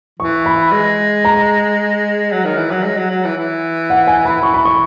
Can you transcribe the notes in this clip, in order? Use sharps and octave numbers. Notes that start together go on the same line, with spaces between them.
E3 C#6
B5
G#3
A#5
F#3
D#3
E3
F#3
G#3
F#3
F#3
E3
E3
F#5
G#5
B5
E3 C#6
B5
C#6